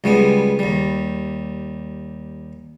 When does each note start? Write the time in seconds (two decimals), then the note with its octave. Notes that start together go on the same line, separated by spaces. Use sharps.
0.04 C#2 G3 G#3 B3
0.59 D#2 G3